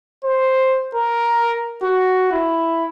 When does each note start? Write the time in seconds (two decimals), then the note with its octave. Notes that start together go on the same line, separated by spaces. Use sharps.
0.24 C5
0.95 A#4
1.83 F#4
2.32 E4